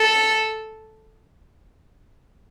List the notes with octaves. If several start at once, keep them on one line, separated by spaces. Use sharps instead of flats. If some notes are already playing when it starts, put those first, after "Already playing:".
Already playing: A4